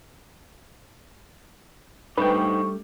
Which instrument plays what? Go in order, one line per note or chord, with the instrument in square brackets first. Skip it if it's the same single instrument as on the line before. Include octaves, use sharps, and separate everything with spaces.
[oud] G3 A3 D4 [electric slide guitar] D#4 C5 [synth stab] B4 G5 [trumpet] C#6